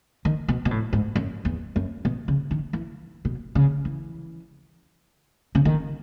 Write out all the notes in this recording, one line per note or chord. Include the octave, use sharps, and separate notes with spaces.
D#3
B2
B2
A2
G#2
F#2
E2
F#2
B2
C#3
D#3
E3
B2
C#3
E3
C#3
D#3